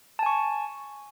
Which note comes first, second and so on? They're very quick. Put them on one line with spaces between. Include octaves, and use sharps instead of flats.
A5 G#5 C#6